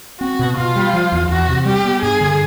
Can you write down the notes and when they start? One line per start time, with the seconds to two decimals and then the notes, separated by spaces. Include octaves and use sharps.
0.20 C4 F#4
0.39 B2
0.57 B2 F4
0.76 G3
0.93 F3
1.12 E2
1.29 E2 F#4
1.48 C3
1.65 G3 G4
1.84 B3
2.02 G2 G#4
2.21 D3